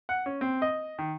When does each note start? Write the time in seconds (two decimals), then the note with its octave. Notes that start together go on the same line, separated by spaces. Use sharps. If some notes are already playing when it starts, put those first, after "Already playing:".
0.09 F#5
0.26 C#4
0.41 C4
0.62 D#5
0.99 D#3